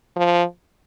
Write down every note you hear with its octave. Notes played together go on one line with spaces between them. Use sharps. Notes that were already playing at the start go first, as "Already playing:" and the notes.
F3